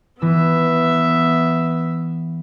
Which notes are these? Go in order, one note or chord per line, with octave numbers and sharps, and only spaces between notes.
E3 B3 E5